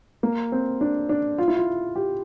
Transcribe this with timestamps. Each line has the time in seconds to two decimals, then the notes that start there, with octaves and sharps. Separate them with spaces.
0.23 A#3
0.52 C4
0.81 D4
1.09 D4
1.38 F4
1.48 E4
1.57 F4
1.96 G4